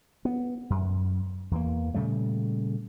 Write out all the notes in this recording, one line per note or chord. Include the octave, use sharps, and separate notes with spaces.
B3
F#2
E2 E3 A#3
A#2 C#3 G3 A3